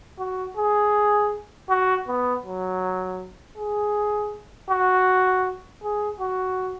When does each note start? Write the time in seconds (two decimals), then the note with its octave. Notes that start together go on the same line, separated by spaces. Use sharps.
0.19 F#4
0.57 G#4
1.69 F#4
2.08 B3
2.45 F#3
3.57 G#4
4.70 F#4
5.83 G#4
6.20 F#4